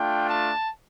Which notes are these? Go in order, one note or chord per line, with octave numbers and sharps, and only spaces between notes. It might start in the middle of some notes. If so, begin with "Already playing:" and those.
Already playing: A3 D4 F4 G5
A5